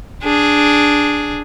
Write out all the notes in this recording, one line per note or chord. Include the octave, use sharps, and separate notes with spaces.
D4 G#4